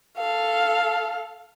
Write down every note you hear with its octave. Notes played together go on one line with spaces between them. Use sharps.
A4 F5